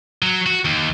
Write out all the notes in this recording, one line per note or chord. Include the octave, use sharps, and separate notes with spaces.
F#3
F#4
D#2